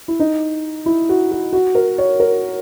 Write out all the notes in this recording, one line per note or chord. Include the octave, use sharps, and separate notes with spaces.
E4
D#4
E4
F#4
F#4
F#4
A#4
C#5
A#4